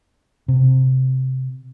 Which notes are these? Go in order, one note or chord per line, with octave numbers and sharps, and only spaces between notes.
C3